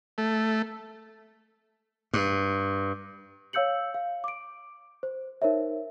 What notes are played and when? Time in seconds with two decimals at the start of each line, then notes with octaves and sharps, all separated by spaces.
0.18 A3
2.13 G2
3.53 C#5 F5 E6 G6 C#7 F#7
3.94 F5
4.24 D6 D7
5.03 C5
5.42 D#4 A#4 C5 C#5 E5